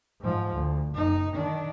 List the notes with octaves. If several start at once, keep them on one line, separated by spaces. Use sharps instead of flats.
G#2 F3
D2
F#1 D#4
D#3 D4